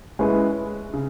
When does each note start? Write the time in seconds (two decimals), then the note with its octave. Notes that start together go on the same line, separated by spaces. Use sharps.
0.19 G#3 C#4 E4 B4
0.93 C#3